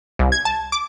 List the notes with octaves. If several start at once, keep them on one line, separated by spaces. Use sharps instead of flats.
C2
G#6
A5
D6